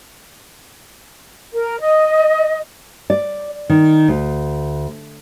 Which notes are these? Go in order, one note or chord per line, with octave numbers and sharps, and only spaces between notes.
A#4
D#5
D5
D#3
D2